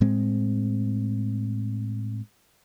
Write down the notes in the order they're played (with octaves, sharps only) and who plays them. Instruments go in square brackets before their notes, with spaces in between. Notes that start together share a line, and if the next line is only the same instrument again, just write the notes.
[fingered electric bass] A2 G#3 C4